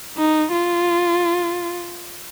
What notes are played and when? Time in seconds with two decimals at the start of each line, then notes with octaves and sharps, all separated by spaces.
0.18 D#4
0.52 F4